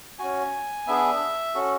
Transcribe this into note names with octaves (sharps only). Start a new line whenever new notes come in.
C#4 F#4 G#5
B3 D4 G#4 E5
C#4 F#4 A4